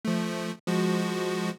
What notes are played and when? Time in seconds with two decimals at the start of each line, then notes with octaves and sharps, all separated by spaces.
0.05 F3 A3
0.67 F3 G#3 F#4